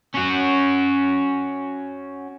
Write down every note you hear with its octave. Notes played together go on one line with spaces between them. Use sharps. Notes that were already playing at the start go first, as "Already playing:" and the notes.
C#4 F#4